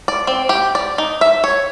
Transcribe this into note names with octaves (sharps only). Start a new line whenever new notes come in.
D5
C4
G4
D5
D#4
E5
C#5